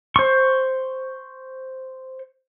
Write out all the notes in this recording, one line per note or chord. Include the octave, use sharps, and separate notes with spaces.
C5 C#6